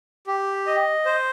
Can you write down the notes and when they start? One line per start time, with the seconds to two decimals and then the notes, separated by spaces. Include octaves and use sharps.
0.27 G4
0.67 D#5
1.05 C5